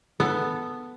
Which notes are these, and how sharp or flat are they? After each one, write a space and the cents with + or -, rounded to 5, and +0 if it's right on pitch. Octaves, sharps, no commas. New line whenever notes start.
B3 +0 A4 +0